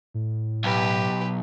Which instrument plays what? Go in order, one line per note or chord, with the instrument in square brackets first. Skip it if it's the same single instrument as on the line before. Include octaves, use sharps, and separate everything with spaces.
[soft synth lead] A2
[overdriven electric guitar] B1 [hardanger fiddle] G4 B4